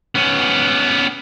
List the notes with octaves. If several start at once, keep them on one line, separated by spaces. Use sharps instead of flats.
B3 C#4